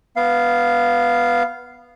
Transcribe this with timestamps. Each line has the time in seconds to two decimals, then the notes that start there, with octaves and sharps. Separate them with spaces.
0.16 B3 F5